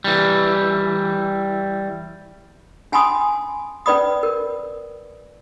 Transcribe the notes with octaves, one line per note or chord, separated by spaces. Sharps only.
E3 G3
C#4 G#5 A5 B5 C6 D#6
C#4 B4 D5 B5 D#6
A#4